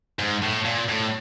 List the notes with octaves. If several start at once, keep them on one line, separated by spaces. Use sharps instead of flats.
G#2
A2
A#2
A2